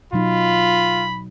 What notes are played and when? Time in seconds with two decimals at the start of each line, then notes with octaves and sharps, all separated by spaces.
0.13 B2 F#3 D#4 F4 B5